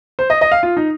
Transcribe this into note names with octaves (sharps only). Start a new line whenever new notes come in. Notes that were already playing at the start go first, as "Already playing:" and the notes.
C5
D#5
D#5
F5
F4
D#4